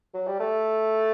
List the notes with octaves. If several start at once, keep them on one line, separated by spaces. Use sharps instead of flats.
F#3
G3
A3